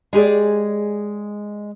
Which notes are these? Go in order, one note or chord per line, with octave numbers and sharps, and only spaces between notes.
G#3 G4 G#4 D5